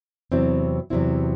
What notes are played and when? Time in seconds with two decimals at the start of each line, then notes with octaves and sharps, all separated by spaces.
0.32 E2 C3 F#3 C4 E4
0.90 E2 C3 F#3 C4 E4